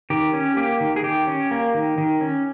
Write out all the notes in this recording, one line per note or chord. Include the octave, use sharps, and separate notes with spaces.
D#3 G4
C#4
A#3 G4
D#3
G#4
D#3 G4
C#4
A#3
D#3
D#3
C#4